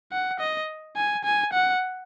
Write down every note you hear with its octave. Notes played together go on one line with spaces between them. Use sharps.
F#5
D#5
G#5
G#5
F#5